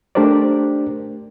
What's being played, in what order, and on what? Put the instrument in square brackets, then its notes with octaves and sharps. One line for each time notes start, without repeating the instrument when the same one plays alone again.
[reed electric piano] A3 D4 G4 A#4 C5 D5